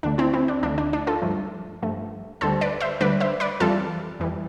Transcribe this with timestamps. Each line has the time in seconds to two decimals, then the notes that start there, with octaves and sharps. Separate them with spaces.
0.03 D2 D3 A3 D4
0.18 C4 E4
0.33 C4 E4
0.48 D4
0.63 D2 D3 A3 D4
0.78 D4
0.93 D4
1.07 F4 A4
1.22 G2 F3 A3
1.82 G2 F3 A3
2.41 D2 D3 G3 A4 C5
2.61 B4 D5
2.80 C5 E5
3.01 D2 D3 G3 B4 D5
3.20 C5 E5
3.40 B4 D5
3.60 F2 E3 G3 F4 A4
4.20 F2 E3 G3